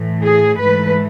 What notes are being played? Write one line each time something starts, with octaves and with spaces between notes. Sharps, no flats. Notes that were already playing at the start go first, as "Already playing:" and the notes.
Already playing: A2 E3 A3
G#4
G#2 E3 A3 B4